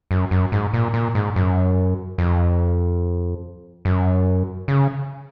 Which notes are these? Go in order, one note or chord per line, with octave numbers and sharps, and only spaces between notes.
F#2
F#2
G#2
A#2
A#2
G#2
F#2
F2
F#2
C#3